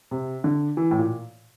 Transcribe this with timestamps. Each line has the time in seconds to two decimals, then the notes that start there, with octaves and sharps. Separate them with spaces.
0.11 C3
0.44 D3
0.77 E3
0.91 A2
0.98 A#2